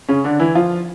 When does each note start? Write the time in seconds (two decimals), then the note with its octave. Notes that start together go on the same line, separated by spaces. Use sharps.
0.08 C#3 C#4
0.24 D3 D4
0.40 E3 E4
0.55 F3 F4